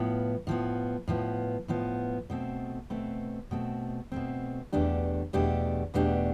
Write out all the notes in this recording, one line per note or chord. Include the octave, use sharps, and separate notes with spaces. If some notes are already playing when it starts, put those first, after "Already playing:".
Already playing: A2 F3 B3
A2 F3 B3
A2 F3 B3
A2 F3 B3
B2 A3 C4
B2 A3 C4
B2 A3 C4
B2 A3 C4
E2 B2 A3 D4 G4
E2 B2 A3 D4 G4
E2 B2 A3 D4 G4